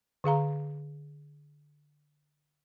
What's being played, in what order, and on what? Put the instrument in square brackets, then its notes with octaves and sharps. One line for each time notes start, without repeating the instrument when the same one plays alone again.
[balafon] D3 G#4 F5 A#5